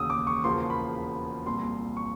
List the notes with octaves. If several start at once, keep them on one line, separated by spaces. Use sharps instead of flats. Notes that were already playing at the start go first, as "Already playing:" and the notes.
Already playing: E1 D#2 C#3 D#6 E6
D6
C#6
E1 E2 C#3 F3 A#3 C6
B5
B5
C2 A#2 F3 C6
C#6